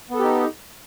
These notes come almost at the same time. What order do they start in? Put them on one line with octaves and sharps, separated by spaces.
B3 A4 G4 D#4